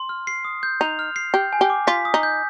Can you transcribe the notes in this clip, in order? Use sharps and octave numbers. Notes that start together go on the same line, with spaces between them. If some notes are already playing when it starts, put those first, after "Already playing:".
Already playing: C6
F6
C7
D#6
G6
D#4 F7
F6
C7
G4 G6
G#5
G4
D6
F4 B6
D#6
D#4
G6